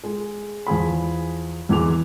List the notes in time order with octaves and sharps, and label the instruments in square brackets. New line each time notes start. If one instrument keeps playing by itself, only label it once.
[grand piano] G#3
E2 F3 G#4 B5
E2 E3 G#3 D6 F7